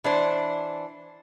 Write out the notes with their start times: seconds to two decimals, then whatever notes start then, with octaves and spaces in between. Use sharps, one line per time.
0.04 E3 D4 C5